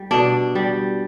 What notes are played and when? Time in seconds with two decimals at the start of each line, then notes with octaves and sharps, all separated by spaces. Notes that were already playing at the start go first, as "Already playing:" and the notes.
Already playing: G3
0.11 B2 D4
0.55 G3